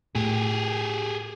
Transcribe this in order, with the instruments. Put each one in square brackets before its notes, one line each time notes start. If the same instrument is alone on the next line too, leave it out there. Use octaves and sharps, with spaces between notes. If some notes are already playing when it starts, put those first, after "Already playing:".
[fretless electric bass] A2 [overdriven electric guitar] G4 G#4